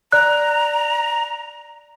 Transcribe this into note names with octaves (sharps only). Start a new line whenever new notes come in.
D5 A#5 F#6